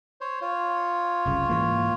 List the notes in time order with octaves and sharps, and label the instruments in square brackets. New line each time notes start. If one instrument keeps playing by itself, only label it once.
[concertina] C5 C#5
F4 C#5
[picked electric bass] F#1 C2 C#3
G#2 E3 A#3